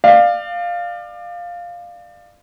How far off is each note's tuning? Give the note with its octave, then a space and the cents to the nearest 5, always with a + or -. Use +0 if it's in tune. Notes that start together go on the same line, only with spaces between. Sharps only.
D5 +30 F5 +0